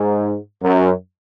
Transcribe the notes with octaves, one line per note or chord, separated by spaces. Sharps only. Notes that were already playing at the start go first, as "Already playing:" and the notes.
Already playing: G#2
F#2